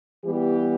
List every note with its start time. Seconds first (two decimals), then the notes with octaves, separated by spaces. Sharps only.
0.25 E3 G3 B3 G4